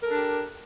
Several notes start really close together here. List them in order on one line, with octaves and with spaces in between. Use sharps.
A#4 A4 D4 G4